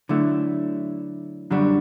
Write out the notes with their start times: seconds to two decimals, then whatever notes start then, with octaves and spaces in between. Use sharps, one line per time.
0.09 D3 F#3 A3 E4
1.51 F#2 D3 G3 D4 F#4